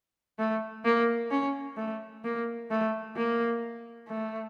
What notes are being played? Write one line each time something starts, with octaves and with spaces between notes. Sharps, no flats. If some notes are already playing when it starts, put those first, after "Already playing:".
A3
A#3
C#4
A3
A#3
A3
A#3
A3